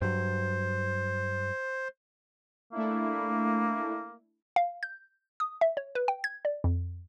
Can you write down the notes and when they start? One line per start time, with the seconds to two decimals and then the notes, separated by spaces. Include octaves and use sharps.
0.02 G2 F#3 C5
2.72 A3 A#3 D4 E4
4.56 F5
4.83 G6
5.40 D#6
5.61 E5
5.77 C#5
5.95 B4
6.08 G5
6.24 G#6
6.45 D5
6.64 F2